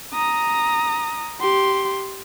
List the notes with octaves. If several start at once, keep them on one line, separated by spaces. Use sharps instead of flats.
A#5 D#6
G4 C6